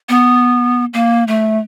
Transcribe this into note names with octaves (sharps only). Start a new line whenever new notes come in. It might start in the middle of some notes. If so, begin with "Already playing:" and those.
B3
A#3
A3